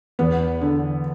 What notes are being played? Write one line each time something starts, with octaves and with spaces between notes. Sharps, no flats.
E2 B3
D3